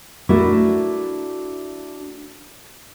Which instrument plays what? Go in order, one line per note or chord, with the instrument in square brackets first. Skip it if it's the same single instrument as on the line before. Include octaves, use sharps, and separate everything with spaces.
[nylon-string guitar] A3 D4 E4 F#4 A#4